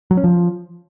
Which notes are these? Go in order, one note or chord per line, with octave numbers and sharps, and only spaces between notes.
F#3
C#4
F3